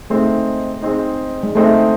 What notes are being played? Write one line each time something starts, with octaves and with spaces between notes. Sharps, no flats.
G#3 A3 C4 D#4
G#3 C4 D#4
G#3
G#3 A3 C4 D#4